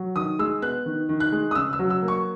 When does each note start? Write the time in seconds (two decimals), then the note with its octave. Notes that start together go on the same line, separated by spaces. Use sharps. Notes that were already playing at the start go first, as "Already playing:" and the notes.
Already playing: F#3
0.16 D#3 D#6
0.39 G#3 E6
0.62 B3 F#6
0.86 D#3
1.09 D#3
1.20 F#6
1.32 G#3
1.51 D#6
1.55 C#3 E6
1.73 E6
1.79 F#3
1.90 E6
2.02 A#3
2.08 C#6